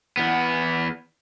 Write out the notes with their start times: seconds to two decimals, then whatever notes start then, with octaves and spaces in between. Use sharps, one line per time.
0.17 E2 B3